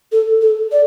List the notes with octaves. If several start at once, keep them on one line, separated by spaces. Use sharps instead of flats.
A4
A4
D5